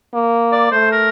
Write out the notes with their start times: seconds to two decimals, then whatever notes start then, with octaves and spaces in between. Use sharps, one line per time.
0.14 A#3
0.52 D5
0.72 A3 C5
0.91 A#4